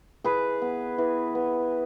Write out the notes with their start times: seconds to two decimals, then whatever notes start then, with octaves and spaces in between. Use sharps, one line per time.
0.24 E3 G#4 B4
0.62 B3
0.98 E3
1.35 B3